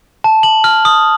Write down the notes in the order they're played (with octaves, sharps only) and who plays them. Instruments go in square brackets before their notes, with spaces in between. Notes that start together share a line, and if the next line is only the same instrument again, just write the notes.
[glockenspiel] A5
F#7
F6
D#6